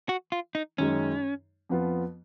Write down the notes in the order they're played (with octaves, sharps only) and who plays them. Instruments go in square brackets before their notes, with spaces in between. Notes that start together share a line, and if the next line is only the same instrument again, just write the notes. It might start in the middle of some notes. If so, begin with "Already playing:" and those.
[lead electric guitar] F#4
F4
D#4
[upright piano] F#2 D#3 G#3 D#4 [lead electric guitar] C#4
[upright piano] F2 F3 B3 F4 B4